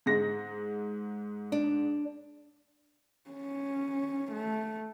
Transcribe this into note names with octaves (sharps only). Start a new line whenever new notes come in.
G#2 G#3 A#6
D4
C#4
A3